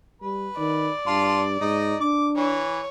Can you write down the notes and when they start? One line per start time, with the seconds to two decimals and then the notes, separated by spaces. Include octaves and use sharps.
0.22 G3 B4
0.58 D#3 D5
1.07 G2 F4 A5 C6
1.61 G#2 D#4 D#5
2.00 D4 D6
2.37 E3 C#5